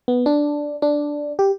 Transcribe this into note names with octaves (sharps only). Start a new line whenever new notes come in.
B3
D4
D4
G4